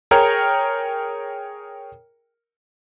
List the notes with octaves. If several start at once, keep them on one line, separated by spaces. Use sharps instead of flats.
G#4 A#4 C#5 G5 A#5 F6